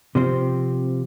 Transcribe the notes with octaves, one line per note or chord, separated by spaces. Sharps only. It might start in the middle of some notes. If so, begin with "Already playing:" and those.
C3 F3 C4